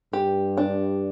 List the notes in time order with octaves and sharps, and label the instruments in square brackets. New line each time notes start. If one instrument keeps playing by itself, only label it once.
[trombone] G2 [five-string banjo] G4
[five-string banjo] D4